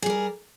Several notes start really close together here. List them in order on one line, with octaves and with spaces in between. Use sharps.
G#4 G3 A#4